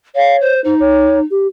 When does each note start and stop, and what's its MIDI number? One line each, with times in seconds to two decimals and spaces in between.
0.15 0.54 73
0.15 0.36 77
0.40 0.60 72
0.64 1.22 63
0.64 0.75 72
0.80 1.19 73
1.31 1.47 67